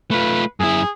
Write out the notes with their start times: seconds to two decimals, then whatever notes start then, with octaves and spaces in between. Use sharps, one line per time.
0.11 A3 F4 B4
0.60 F#2 E4 G#4